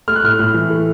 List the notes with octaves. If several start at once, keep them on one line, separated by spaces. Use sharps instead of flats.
A3 F6
F#6
A2 F6
A2
E3
A3